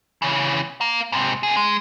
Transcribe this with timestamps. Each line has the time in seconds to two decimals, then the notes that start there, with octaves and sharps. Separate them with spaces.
0.22 C#3 E3
0.81 F5 A#5
1.12 G#2 C3
1.43 C3 G#4
1.56 G#3